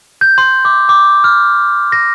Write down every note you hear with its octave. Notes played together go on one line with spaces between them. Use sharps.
G6
C6
D6
D6
F6
A#6